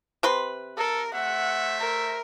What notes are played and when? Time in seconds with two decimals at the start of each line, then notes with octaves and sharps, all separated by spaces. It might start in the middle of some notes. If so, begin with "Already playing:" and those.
0.23 C3 B4 C6
0.77 A4 A#4
1.15 A3 C5 E5 F#5
1.80 A#4